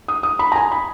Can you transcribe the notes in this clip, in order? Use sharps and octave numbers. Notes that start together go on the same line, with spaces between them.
D#6
D#6
B5
A#5
G#5
B5